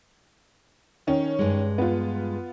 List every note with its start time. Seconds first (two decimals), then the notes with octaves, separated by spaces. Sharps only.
1.07 D#3 C#4
1.39 G2 G#3
1.78 B3 F4